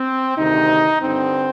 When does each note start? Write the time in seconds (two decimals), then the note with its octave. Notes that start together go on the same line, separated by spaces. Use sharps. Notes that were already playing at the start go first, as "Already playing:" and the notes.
Already playing: C4
0.36 D2 C3 D#3 D#4
1.01 G2 D3 C4